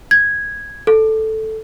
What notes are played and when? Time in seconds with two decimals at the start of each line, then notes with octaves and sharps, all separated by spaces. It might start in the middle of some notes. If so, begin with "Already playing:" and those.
0.11 G#6
0.87 A4